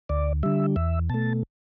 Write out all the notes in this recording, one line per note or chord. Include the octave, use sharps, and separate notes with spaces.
D2 D5
D3 G3 E5
E2 E5
B2 A3 A5